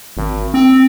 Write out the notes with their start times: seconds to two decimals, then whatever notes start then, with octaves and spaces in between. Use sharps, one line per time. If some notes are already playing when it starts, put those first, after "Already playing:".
0.17 G#1
0.54 C4